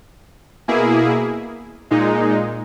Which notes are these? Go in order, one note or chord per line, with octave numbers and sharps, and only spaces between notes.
B2 A#3 E4 G#4
A#2 G#3 D#4